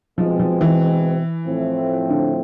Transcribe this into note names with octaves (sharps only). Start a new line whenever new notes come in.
B2 F3 G#3 C4
F3
E3
A2 F3 A3 C4
D3